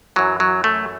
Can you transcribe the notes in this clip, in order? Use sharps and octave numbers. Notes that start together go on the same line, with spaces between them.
F#2 E3 F#3
F#3
A3